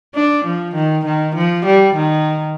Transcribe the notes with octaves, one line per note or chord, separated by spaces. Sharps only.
D4
F3
D#3
D#3
F3
G3
D#3